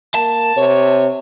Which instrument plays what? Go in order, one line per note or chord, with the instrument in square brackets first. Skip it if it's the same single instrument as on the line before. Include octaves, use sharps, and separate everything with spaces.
[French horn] A#3 [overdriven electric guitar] A5
[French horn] C3 [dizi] C#5